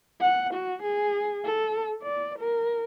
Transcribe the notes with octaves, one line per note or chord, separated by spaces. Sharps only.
F#5
F#4
G#4
A4
D5
A#4